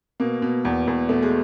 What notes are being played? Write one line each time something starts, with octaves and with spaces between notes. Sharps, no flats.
B2 A#3
B2
E2
E2
B2 A3
G#3